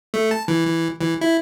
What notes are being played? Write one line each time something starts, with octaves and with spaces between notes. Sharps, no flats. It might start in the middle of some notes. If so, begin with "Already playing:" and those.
A3
A5
E3
E3
E3
E4